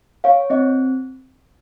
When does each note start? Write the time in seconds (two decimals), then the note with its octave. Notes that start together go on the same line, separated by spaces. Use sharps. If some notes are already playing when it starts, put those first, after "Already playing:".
0.24 C#5 F5
0.50 C4 D#5